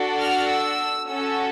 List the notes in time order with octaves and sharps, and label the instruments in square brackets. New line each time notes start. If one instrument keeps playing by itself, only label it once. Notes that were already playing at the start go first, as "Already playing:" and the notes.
Already playing: [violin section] D4 F#4 A4
F6
E6
C#4 F#4 A4 E6